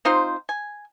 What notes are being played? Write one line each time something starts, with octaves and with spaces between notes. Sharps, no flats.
C4 D#4 F4 C5
G#5